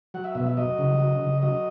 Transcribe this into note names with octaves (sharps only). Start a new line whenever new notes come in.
F#3 F#5
E5
B2 E5
E5
F#3 D#5
C#3
F#3
C#3
F#3 D#5